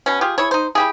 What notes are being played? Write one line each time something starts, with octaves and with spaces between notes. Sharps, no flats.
B2 C#4
F4 G4 G#4
E4 G#4 C#5
D#4 C5
E4 G4 G#4